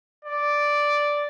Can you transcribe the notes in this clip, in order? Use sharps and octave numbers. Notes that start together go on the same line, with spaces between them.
D5